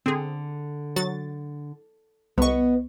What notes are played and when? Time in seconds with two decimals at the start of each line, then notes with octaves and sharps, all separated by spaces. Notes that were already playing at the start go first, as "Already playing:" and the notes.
0.06 D3 C4 G#4
0.96 F#3 F#4 A6
2.38 C2 B3 D#5 C#6